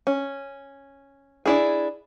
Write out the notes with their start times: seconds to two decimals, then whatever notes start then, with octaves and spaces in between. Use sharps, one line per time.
0.07 C#4
1.46 D4 E4 G#4